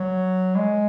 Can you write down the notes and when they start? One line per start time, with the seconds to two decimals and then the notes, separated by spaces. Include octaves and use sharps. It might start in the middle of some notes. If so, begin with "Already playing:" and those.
Already playing: F#3
0.55 G#3